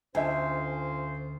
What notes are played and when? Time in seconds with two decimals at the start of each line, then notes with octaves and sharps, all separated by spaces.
0.15 D2 C#4 F4 C5 E5 G#5